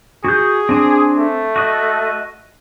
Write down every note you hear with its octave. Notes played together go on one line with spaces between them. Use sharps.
F#4 G#4 G6
C4 D4 G#5
A3
F#4 D#5